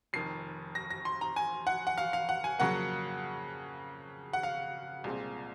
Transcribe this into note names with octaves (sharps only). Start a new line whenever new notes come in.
F1 F2 D#3 C7
A#6
A#6
C6
A#5
G#5
F#5
F#5
F5
F5
F#5
G#5
F2 C#3 F#3 A#3 F#5
F#5
F5
C2 A#2 G#3 C4